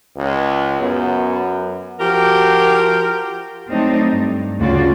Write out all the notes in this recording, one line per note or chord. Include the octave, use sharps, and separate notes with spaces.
C#2
F#2 B3
F3 F#4 G4 A#4
F#3 A3 C4 D4 D#4
G2
D2 C#3 A3 F4 F#4 D5